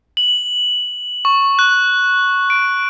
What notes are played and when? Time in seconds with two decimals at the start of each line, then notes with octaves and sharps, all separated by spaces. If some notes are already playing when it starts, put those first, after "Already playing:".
0.17 F#7
1.25 C#6
1.59 F#6
2.50 D7